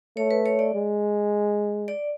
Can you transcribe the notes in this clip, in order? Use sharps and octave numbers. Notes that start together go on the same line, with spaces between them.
A3 C#5
B4
C#5
D5
G#3
D5